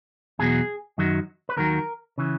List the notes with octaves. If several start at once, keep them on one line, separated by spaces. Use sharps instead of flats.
E2 B2 F#3 G#4
F#2 D#3 F#3
B4
D#2 D#3 F#3 A#4
C#3 E3